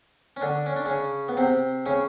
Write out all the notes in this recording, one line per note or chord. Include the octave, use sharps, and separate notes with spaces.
C#4
D3 D4
C#4
D4
C#3 C#4
B3
C3 C4
C#3 C#4